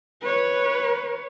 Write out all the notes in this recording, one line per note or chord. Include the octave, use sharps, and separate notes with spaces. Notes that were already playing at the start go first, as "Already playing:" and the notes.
B4 C#5